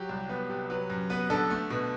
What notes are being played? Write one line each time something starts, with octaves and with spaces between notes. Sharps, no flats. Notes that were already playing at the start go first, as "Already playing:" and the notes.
Already playing: F#3 G4
C2
B3
C3
F#3 B4
F#2
B3 B4
D3 A4
A3
B2